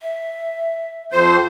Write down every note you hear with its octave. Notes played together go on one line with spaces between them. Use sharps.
E5
F2 F4 C5